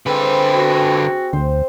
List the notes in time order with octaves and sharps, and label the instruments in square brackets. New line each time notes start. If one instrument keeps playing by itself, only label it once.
[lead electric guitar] D3 B4 [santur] C4 G#4
[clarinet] F#4
[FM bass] D2 [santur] C5